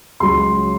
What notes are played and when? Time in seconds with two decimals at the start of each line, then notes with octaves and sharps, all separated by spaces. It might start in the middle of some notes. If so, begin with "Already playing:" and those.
0.20 C#2 C#3 F#3 C6